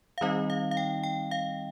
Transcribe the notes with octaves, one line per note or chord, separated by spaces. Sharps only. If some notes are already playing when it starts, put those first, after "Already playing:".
F5
D#3 G3 C4 D#4 D#5
F5
F5
G5
G5
F5